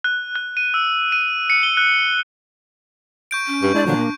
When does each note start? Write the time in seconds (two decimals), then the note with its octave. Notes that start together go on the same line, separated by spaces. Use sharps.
0.04 F#6
0.36 F#6
0.57 D#7
0.74 E6
1.12 D#7
1.50 C#7
1.63 G7
1.77 F#6
3.31 C#6 G6 D7
3.47 C#4
3.63 G2 C#6
3.75 G#3 D4 E4 D5
3.86 A#2 D3 F3 F#3 D4
3.99 A#3